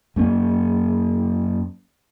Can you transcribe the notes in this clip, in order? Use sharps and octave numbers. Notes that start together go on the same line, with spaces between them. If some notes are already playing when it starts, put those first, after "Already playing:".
F#2 A#3 C#4